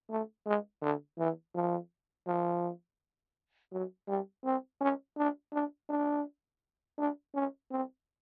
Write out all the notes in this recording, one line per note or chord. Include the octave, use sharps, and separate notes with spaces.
A3
G#3
D3
E3
F3
F3
F#3
G3
C4
C#4
D4
D4
D4
D4
C#4
C4